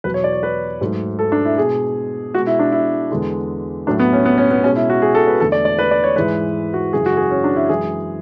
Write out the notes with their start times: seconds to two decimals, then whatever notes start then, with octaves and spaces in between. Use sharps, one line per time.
0.04 E2 B2 F#3 B4
0.14 C#5
0.24 D5
0.33 C#5
0.43 B4
0.81 G#2 F#3 A3
1.19 A4
1.32 D4
1.45 E4
1.57 B2 G#3 G#4
2.34 G#3 F#4
2.38 B2
2.47 E4
2.59 D4
2.72 E4
3.11 E2 D3 G#3
3.87 A2 F#3 A3 D4
3.99 B3
4.13 C#4
4.25 B3
4.38 C#4
4.51 B3
4.63 B2 G#3 C#4
4.76 E4
4.90 F#4
5.02 G#4
5.15 A4
5.27 B4
5.40 E2 D3 A3 A4
5.52 D5
5.65 D5
5.79 B4
5.91 D5
6.04 C#5
6.16 G#2 E3 G#3 B4
6.74 F#4
6.93 F#2 C#3 E3 G#3 G#4
7.06 F#4
7.17 G#4
7.31 C#4
7.44 D4
7.56 E4
7.69 F#2 E3 G#3 G#4